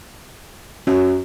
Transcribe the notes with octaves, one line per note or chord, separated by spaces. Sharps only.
F#2 F#3